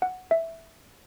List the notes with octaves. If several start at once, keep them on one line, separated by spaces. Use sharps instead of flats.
F#5
E5